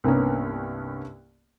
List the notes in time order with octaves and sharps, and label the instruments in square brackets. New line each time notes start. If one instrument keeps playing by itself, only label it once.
[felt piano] C2 G2 A#3 B3 C#4